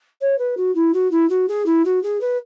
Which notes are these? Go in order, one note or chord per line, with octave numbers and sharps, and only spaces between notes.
C#5
B4
F#4
E4
F#4
E4
F#4
G#4
E4
F#4
G#4
B4